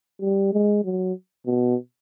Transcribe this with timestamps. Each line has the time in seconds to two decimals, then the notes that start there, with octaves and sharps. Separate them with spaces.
0.21 G3
0.53 G#3
0.84 F#3
1.47 B2